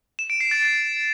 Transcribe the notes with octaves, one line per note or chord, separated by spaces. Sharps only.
E7
D7
C7
A6